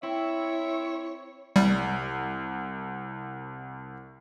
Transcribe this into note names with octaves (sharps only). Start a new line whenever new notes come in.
C4 E4 C#5 E5
C2 G3